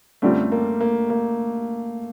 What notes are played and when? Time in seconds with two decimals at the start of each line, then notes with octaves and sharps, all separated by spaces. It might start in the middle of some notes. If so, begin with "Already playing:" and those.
0.22 F#2 D3 G3 A3 C4 F4
0.52 A#3
0.81 A#3
1.10 A#3